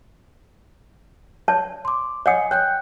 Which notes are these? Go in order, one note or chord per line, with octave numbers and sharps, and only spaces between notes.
C#5 D5 A5
C6 D6
C#5 D#5 F#5 G#5 D#6 C#7
C#5 G5 F#6 G6